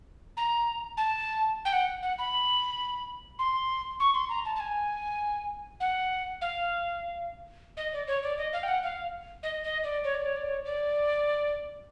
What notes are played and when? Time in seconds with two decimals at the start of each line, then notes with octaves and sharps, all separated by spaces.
0.37 A#5
0.97 A5
1.65 G5
1.73 F#5
2.02 F#5
2.19 B5
3.39 C6
4.00 C#6
4.14 C6
4.29 A#5
4.45 A5
4.55 A5
4.60 G#5
5.80 F#5
6.41 F5
7.77 D#5
7.93 D5
8.07 C#5
8.23 D5
8.38 D#5
8.53 F5
8.63 G5
8.68 F#5
8.83 F5
9.43 D#5
9.64 D#5
9.84 D5
10.04 C#5
10.14 D5
10.26 C#5
10.36 D5
10.48 C#5
10.65 D5